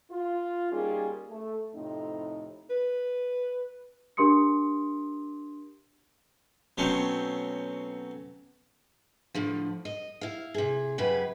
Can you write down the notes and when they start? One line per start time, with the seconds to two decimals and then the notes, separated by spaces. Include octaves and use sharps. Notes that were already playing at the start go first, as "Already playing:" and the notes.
0.11 F4
0.72 G3 A#3 C#4 D#4 F4 G#4
1.30 A3
1.74 F2 A2 C3 C4 D#4
2.70 B4
4.17 D4 G4 A#4 C6 D#6 C#7
6.78 B2 F#3 A3 C4 C#4 G5
9.35 A2 D3 F3
9.85 D#5
10.21 E4 F5
10.54 C3 G#4
10.98 F#2 C#3 G4 B4 G#5